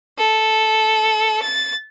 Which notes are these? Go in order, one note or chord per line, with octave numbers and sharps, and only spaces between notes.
A4
A6